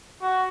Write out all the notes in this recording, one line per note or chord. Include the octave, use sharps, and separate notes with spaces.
F#4